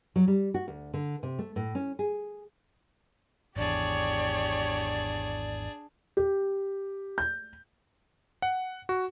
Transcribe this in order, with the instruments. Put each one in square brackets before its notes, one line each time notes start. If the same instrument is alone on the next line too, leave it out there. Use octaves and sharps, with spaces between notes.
[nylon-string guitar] F#3
G3
F#4
D2
D3
C3
A3
A2
C#4
G#4
[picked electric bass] G#1 E2 [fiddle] D4 G#4 [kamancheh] G4 C#5 [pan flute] D5
[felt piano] G4
G6
[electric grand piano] F#5
F#4